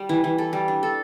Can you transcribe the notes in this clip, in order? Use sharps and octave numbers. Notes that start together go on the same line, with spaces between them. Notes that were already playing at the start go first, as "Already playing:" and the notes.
Already playing: G3
E3
E3
A4
G3
D4
A4